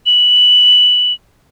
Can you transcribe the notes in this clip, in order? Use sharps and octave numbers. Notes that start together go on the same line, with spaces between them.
F#7